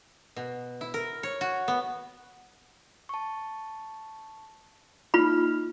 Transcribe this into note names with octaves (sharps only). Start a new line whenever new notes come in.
B2
E4
A#4
C#5
F#4
B3
A5 C#6
A#3 D#4 F4 B5 F6